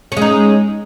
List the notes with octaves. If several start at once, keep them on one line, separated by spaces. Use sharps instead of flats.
G#3 C#4 D#4